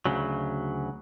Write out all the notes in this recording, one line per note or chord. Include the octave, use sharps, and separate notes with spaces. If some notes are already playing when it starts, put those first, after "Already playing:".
D2 C#3 F#3